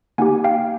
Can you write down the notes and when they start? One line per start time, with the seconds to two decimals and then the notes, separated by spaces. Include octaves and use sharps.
0.18 A#3 D#4 G4 F#5 G#5
0.44 F5 G5